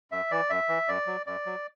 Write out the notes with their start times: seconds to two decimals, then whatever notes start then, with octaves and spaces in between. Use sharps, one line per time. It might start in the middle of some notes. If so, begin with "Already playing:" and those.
0.12 F#2 E5
0.31 E3 D5
0.50 F#2 E5
0.69 E3
0.88 F#2 D5
1.07 F#3
1.26 F#2 D5
1.46 F#3